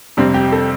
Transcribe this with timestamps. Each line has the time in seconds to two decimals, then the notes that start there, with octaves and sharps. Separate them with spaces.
0.17 F2 C3 G3 C4
0.34 G4
0.52 A4